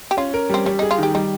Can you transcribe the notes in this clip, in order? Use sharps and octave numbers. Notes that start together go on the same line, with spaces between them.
G4
C#4 F4
A#4
G3 C4
G3 C#4
D#4 G#4
F4
D#3 G4
G3 D#4